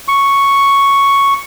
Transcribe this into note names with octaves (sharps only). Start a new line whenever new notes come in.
C#6